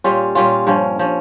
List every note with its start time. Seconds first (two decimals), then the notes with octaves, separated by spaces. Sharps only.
0.04 A#2 G3 C#4 F4
0.35 A#2 G3 C#4 F4
0.67 G2 F3 C#4
0.99 F3 C#4